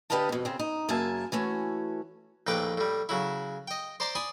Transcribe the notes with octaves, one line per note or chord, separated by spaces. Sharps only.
D3 G4 B4 D#5 F5 A5
F2 B2
C#3 C4
D#4
F#2 C#3 A#3 E5 G#5 A5
E3 A3 C#4 F#4
A#1 D#2 A2 B4 G5 D6
A2 G3
C#3 F#3 E4
D#5 G5
C5 D5 A#5 C6 D6
D5 G#5 B5 D#6